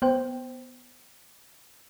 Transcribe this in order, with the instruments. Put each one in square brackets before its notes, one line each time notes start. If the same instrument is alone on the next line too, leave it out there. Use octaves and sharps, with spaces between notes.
[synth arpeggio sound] B3 C5 G5